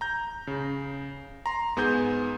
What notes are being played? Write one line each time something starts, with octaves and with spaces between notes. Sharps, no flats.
A#5 G6
C#3
A#5 C6
G#2 B3 G#4 G6